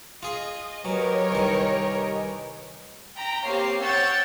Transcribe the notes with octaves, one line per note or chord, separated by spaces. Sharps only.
F4 G#4 D#5
F#3 G4 A#4 B4 C#5 D#5 G#5
C2 D#3
G5 A#5 B5
A#3 C4 G4 C#5 F5 C7
C#5 F#5 G5 E6 G6 A6